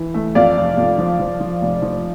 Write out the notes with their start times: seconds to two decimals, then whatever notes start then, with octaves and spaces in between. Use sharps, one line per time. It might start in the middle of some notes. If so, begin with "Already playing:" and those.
Already playing: E3
0.14 A3
0.35 F2 D5 F5
0.57 F1
0.77 F2
0.98 F3
1.19 F3
1.40 F3
1.62 F1
1.82 F3